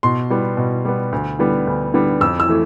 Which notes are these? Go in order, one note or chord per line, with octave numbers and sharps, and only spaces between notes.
B2 C6
G3 B3
B2
G3 B3
D2
D3 G3 B3
D2
D3 G3 B3
F2 E6
E6
E3 A3